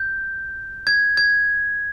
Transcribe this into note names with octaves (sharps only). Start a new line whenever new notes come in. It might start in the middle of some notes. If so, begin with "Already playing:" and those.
Already playing: G6
G#6
G#6